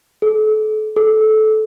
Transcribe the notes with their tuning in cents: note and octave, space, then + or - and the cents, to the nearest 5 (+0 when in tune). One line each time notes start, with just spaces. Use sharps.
A4 -35
A4 -20